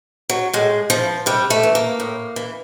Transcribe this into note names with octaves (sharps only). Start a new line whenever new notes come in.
F#3
A2 G#3
E3 F3
C3 G3
A3
E3
A#3
A2
E3